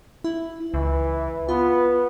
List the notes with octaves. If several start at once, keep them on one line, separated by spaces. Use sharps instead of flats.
E4
C#2 E3
B3 F4